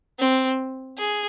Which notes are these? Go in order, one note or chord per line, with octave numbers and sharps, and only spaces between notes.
C4
G#4